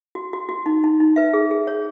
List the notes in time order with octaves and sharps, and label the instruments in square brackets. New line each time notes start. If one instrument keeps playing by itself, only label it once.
[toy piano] F#4
F#4
F#4
D#4
D#4
D#4
B4 E5
G#4
G#4
C#5